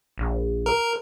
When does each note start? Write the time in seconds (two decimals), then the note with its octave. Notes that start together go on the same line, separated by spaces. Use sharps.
0.18 A#1
0.66 A#4